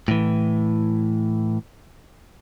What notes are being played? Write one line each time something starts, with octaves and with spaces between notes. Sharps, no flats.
A2 E3